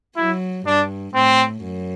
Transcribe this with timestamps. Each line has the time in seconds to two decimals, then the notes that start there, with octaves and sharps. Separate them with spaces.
0.17 F#3 E4
0.66 G2 D4
1.14 A2 C4
1.63 F#2